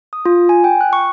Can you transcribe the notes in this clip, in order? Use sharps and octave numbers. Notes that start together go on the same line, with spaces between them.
D#6
F4
G#5
G5
F#6
C#6